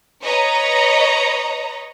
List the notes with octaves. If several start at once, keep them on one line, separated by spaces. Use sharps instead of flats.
B4 C#5 D#5 A#5